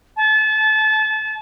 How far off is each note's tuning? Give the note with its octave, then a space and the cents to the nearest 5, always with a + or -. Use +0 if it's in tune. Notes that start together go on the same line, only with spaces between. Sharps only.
A5 -30